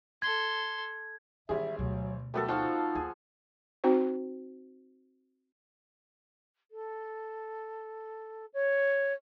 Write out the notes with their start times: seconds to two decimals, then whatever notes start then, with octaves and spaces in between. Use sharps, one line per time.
0.22 A4 C6 G#6
1.49 G#1 E3 G3 G#4 E5
1.79 D2 B2 F#3
2.34 F#3 G3 A3 B3 A4 A#4
2.48 F3 D#4 F4 F#4 F5 F#5
2.95 D#2 G#4
3.84 C4 D#4 F#4 C5
6.71 A4
8.53 C#5